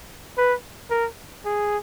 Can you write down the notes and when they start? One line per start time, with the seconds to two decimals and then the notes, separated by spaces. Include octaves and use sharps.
0.38 B4
0.91 A#4
1.45 G#4